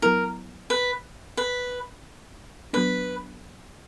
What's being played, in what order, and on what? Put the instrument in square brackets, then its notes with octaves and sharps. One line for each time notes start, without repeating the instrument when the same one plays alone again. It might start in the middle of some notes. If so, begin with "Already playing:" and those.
[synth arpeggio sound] F#3 B3 E4 [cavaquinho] A#4
[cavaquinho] B4
B4
[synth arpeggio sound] F#3 B3 D4 [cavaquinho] B4